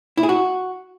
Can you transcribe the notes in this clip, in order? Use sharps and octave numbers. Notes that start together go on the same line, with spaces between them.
E4
G#4
F#4